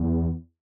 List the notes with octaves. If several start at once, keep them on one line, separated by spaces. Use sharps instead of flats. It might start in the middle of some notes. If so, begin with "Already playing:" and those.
Already playing: E2